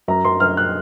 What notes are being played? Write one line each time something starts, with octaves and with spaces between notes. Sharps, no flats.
F#2 A#5
F#2 C6
F#2 F6
F#6